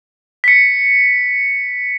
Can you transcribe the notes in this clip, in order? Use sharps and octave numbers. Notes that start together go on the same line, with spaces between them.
B6 C#7